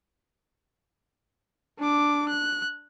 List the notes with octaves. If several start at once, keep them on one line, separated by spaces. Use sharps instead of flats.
D4 D6
F#6